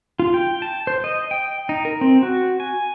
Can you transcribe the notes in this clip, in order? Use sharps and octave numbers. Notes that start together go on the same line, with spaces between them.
F4
G5
A5
C5
D#5
G5
D#4
A#4
C4
F#4
G#5